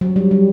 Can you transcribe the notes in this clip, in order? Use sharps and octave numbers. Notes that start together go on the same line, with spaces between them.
F#3
G3
G3